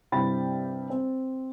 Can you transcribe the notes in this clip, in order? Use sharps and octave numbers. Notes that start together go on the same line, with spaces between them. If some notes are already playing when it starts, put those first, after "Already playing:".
G2 C3 E4 G5 B5 A6
C4